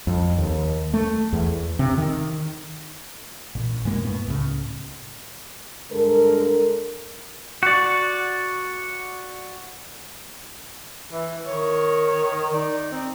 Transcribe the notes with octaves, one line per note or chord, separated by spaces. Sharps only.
F2
D#2
A3
E2
C3
D#3
A1 A#2
G2 B2 G#3 A#3
F#2 A2 B3
C#2 A2 C#3
G2 D3 G#3 A4 A#4
F#4 D5
E3
D#3 C#5
D#4 D5
C4